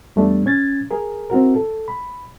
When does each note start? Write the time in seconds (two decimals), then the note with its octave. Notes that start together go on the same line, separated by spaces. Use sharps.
0.16 E2 G3 A3 B3 D4
0.46 C#4 G#6 A6
0.91 G#4 A#4
1.30 C4 E4 F#4 A#4
1.55 A4
1.88 B5